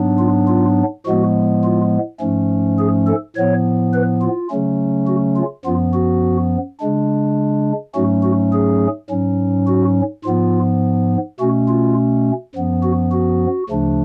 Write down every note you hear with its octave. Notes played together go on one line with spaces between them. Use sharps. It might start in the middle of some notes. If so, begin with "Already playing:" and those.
Already playing: G#2 F#3 B3 D4
F4
F4
A2 F3 G#3 B3 F#4
F4
G#2 F3 A3 C#4
G#4
A4
A2 F3 B3 C#5
B4
F4
C#3 F#3 A3 C#4
F#4
F4
F#2 F3 B3 F4
F#4
C#3 G#3 D4
G#2 F#3 A3 C#4 F#4
F#4
G#4
G#2 F#3 C#4
F#4
G#2 F3 B3 F4
B2 A3 C#4 F#4
F4
F#2 F3 B3
F#4
F#4
D2 C#3 F3 A3 D4